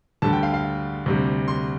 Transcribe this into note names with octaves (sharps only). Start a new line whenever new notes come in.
D2 D3 G3 A5
G5
F5
F5
D2 C3 G3
C6